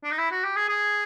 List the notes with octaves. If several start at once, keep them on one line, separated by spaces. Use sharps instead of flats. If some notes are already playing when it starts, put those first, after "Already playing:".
D4
D#4
E4
F#4
G4
G#4
G#4